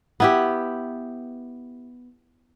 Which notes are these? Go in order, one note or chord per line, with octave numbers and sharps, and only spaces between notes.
B3 E4 G4